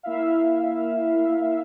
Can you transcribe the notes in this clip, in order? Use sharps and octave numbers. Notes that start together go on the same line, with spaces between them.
A#3 E4 E5 F5